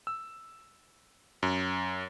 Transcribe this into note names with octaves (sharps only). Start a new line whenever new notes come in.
E6
F#2